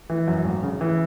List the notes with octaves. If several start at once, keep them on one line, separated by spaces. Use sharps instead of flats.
E3
F#2
G#1
C#3
E3